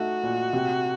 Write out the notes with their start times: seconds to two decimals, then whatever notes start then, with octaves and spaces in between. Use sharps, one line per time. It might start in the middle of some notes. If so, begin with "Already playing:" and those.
Already playing: A3 D#4 F#4
0.23 A#2
0.53 C3